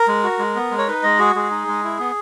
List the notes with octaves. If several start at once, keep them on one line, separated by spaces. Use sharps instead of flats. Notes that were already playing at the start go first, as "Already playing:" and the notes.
Already playing: A#4
G#3
F#4
G#3
B3
G#3
C#5
D#4 B4
G#3 D#5
F#4 G#4
G#3 G#4
D#4
G#3
E4
B3